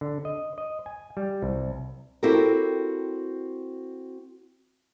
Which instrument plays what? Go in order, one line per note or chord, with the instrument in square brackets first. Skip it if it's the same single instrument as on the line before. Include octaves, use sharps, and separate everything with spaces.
[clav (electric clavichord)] D3
D#5
D#5
G#5
G3
C2
[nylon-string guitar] C4 E4 F#4 G4 A4 A#4